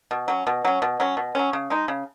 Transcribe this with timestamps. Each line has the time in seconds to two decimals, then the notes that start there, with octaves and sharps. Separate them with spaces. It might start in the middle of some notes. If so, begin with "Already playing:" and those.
0.11 B2
0.28 F#3 C#4
0.47 B2
0.65 F#3 C#4
0.82 B2
1.00 F#3 C#4
1.17 B2
1.35 F#3 C#4
1.53 C#3
1.70 G#3 D#4
1.88 C#3